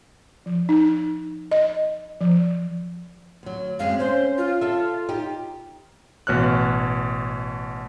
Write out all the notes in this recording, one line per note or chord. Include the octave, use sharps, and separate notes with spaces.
F3
D#4
D#5
F3
D2 F#3
F#2 G#3 C4 F5
C#4 C5
F4
A4 E5
D#4 G4
A1 B2 C#5 F6 F#6